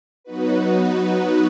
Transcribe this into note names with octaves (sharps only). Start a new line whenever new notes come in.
F#3 B3 D#4 F#4 B4